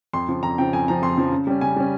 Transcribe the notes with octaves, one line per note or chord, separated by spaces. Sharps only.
F2 C6
C#3 F3
F2 A#5
C#3 F3 G5
F2 G#5
C#3 F3 A#5
F2 C6
C#3 F3
C#3
G3 C#4
C#3 G#5
G3 C#4